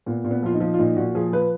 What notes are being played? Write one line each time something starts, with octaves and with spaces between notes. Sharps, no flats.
A#2 B3
A#2
B3
F3 F4
D#4
F3
F4
A#2 D#4
A#2 F#4
F3 G#4
F3 B4